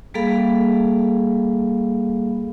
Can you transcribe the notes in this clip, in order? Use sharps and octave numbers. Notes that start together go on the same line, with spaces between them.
G3 A#3 G#4 A4 F5 B5